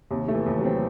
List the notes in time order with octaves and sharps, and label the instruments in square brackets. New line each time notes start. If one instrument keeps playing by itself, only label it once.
[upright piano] D#2 [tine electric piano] C3
[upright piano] A3
[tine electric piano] E3
[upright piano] D#2
[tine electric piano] F#3
[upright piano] C4